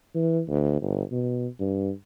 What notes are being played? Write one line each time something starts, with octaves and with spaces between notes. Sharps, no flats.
E3
D2
G1
B2
G2